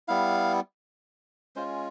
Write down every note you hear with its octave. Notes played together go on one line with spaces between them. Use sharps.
G3 B3 E4 F5
G#3 C#4 F4 C5